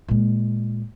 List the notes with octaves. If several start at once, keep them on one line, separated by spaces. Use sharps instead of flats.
A#2 G#3